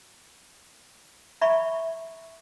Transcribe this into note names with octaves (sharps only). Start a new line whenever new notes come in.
E5 A#5 B5 C#6